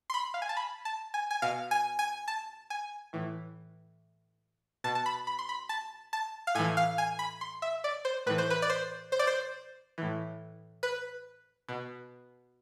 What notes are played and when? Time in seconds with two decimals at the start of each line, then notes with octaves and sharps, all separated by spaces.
0.10 C6
0.14 B5
0.34 F5
0.42 G#5
0.49 A5
0.57 B5
0.85 A5
1.14 G#5
1.31 G#5
1.42 B2 F5
1.71 G#5
1.99 G#5
2.28 A5
2.70 G#5
3.13 A2 E3
4.84 B2 A5
4.95 A5
5.06 B5
5.27 B5
5.39 C6
5.49 B5
5.69 A5
6.13 A5
6.47 F5
6.55 A2 E3 G#5
6.77 F5
6.98 G#5
7.19 B5
7.41 C6
7.62 E5
7.84 D5
8.05 C5
8.26 A2 E3 B4
8.38 C5
8.50 B4
8.62 D5
8.70 C5
9.12 C5
9.19 D5
9.27 C5
9.98 A2 E3
10.83 B4
11.69 B2